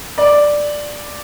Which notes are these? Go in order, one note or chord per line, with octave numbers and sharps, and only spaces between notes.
D5